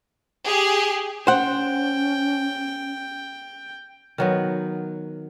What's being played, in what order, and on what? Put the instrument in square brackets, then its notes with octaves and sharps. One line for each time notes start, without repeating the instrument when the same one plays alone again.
[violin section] G4 G#4
[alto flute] C#4 [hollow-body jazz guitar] C5 F#5 [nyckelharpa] G5
[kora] D#3 F#3 B3